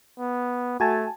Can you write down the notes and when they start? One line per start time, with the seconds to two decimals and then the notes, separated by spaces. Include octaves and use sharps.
0.19 B3
0.80 A3 F#4 G#5 A5